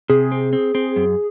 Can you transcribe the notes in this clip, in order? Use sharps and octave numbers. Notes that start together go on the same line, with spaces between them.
C3 G#4
C4
C4
C4
F#2